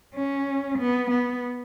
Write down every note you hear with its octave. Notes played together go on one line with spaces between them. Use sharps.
C#4
B3
B3